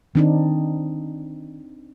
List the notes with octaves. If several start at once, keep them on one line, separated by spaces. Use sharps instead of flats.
D#3 C4 D4 D#4